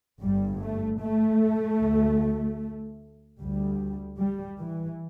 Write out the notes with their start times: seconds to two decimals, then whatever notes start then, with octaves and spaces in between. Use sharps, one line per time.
0.20 G1 G2 G3
0.60 A3
1.00 A3
1.79 D2
3.39 D2 G3
4.18 G3
4.59 E3